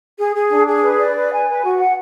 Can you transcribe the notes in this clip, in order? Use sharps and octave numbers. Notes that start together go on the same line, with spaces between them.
G#4
G#4
D4
G#4
B4
D5
B4
G#5
B4
F#4
F#5